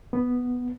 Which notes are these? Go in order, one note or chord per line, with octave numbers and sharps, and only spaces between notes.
B3